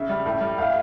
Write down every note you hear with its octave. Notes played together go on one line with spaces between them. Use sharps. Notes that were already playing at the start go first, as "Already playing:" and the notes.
Already playing: C#3 E5
G3
A2
G3
A2 F5